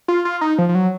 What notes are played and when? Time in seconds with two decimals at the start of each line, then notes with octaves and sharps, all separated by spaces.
0.08 F4
0.25 F4
0.41 D#4
0.58 F3
0.69 F3
0.75 F#3